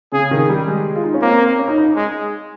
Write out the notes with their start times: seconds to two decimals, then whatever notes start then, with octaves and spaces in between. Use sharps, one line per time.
0.12 C#3 G#4
0.31 D#3
0.50 G3
0.68 G#3
0.96 F4
1.04 D#4
1.14 C#4
1.22 A#3 C4
1.59 C#4
1.68 D#4
1.78 D#4
1.96 G#3